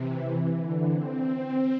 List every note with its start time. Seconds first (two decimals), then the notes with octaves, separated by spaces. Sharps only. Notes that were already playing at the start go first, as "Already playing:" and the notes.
Already playing: C3 E3
0.59 D3
0.91 C4
1.25 C4